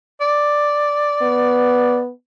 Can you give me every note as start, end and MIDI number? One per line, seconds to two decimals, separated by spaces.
0.21 1.98 74
1.22 2.11 59